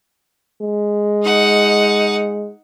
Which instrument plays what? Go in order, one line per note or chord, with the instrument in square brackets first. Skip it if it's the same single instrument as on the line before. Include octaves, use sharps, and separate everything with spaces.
[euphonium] G#3
[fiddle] D#4 F#5